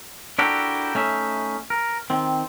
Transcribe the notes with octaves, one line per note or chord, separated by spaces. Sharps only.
D4 E4 F#4 G4 A4 A#4
A3 C#4 D#4 E5
A#4
D#3 C4